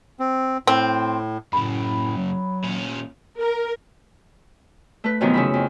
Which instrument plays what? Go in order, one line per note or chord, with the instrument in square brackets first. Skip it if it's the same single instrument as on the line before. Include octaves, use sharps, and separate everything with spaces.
[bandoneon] C4
[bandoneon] A2 [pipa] C4
[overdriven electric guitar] F#2 C#3 [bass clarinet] A2 [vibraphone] B5
[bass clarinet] F#3
[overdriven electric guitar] A#2 C#4
[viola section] A#4
[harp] A3 B4
F#2 C3 D#3 F3 F#3 B3
C#3 E4 B5
F2